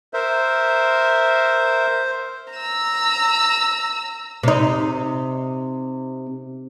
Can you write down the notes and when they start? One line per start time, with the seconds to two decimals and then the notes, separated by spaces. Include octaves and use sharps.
0.14 A#4 C5 E5
2.53 A#5 E6
4.43 C3 D#4